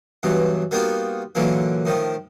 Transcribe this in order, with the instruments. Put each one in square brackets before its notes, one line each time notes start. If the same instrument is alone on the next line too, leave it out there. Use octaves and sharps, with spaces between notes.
[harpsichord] G2 B2 E3 F#3
G3 A#3 B3 D#4 F4 F#4
A#2 D3 E3 F#3 A#3
A2 D#3 F3